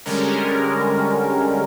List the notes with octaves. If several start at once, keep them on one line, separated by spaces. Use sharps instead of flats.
D3 G3 G#3 C#4 A#4